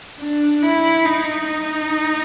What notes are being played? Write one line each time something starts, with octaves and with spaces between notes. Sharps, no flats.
D4
E4
D#4
D#4